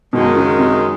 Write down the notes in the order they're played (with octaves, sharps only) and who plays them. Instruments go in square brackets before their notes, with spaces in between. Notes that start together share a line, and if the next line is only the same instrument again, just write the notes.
[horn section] F#2 D#3 G#3 [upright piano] B2
[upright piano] C#3
C3